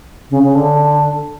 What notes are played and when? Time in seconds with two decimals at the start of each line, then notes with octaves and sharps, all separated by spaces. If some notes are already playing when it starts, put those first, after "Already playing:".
0.30 C#3
0.43 C#3
0.55 D3